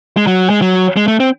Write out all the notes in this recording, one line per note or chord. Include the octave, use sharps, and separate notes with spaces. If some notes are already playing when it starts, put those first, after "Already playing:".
G#3
F#3
G#3
F#3
G#3
A3
C4